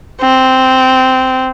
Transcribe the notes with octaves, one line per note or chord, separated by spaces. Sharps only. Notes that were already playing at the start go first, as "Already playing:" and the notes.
C4